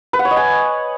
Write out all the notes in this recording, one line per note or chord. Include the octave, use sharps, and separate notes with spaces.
B4
F#5
C#5
D#5
G#5